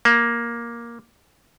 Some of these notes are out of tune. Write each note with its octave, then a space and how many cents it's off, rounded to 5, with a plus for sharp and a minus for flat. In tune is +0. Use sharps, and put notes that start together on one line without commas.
A#3 +10